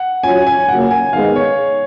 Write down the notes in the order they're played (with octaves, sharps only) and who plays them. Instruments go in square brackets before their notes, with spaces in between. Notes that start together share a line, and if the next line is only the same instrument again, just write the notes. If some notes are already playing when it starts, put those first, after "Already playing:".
Already playing: [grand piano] F#5
[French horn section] F#3 C#4 F4 [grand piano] G#5
[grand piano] G#5
[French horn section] C#3 F#3 A#3 [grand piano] F#5
[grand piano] G#5
[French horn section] G#2 D#3 G#3 B3 [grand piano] F5
[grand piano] C#5